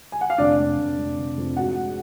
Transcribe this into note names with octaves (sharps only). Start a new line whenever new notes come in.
G#5
F#5
F5
F1 D4 D5
F1
F1
F1
F1
F2
G#2 F#4 F#5
G#3